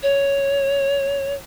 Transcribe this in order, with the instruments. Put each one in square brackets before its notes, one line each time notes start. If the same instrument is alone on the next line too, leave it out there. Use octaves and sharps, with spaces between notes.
[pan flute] C#5